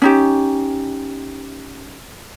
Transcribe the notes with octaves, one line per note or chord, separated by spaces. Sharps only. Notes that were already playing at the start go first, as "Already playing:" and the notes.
C#4 D#4 G4